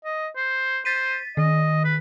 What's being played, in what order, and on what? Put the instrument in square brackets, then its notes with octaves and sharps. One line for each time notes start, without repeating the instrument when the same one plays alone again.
[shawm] D#5
C5
[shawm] C5 [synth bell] A6 B6 D#7
[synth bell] D#3 [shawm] D#5
[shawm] B4